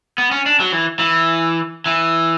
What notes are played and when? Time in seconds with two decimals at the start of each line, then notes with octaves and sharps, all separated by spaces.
0.18 B3
0.31 C#4
0.46 D4
0.60 F#3
0.72 E3
0.99 E3
1.86 E3